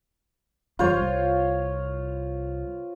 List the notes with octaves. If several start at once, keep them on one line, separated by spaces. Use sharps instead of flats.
F#1 E2 G3 F4 C5 C#5
C2